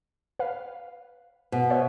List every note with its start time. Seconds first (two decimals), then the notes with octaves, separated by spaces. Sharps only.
0.39 B4 F5
1.52 B2
1.70 C5 C#5 E5